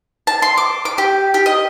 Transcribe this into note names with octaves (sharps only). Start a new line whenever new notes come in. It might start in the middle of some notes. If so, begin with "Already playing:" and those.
A5
C6
D6
D6
G4
G4
D#5